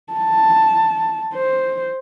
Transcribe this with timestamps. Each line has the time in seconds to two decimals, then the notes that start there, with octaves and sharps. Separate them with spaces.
0.13 A5
1.34 C5